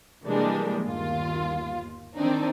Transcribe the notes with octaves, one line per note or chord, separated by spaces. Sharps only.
C3 E3 G3 G#3 A#3 D4
G1 D#2 F4
D#3 C4 D4 D#4